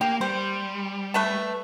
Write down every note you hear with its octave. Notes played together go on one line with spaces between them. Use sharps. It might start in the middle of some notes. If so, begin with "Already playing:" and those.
A#3 G4
G3 C5
A3 B4 A5